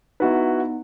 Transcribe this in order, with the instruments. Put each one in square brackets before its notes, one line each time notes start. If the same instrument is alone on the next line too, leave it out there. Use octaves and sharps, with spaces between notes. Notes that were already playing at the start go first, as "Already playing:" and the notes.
[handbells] B3 D#4 [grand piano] E4 F#4 B4